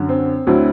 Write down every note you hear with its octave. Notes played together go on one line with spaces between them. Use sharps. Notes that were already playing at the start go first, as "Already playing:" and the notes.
Already playing: F#2 D3 F#3
C4
D2 D3 F#3 C4 E4